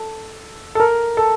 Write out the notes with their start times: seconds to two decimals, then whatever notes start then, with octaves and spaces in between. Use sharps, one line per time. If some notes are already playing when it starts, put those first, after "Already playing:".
Already playing: A4
0.75 A4
0.80 A#4
1.17 A4